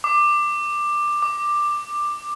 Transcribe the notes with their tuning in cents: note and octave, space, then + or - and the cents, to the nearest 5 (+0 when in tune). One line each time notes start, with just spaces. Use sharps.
D6 +15
D6 +10